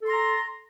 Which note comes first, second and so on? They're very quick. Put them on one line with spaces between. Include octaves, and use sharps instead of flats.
A4 C6 A#5